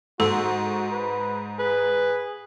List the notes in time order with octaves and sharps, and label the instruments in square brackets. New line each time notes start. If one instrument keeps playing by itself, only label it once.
[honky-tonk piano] G#2 [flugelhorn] F#4 [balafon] A4
[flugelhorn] B4
[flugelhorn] G#4 [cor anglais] B4